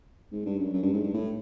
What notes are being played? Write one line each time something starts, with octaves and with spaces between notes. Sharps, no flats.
G#2
G2
F#2
F#2
G2
G#2
G2
A2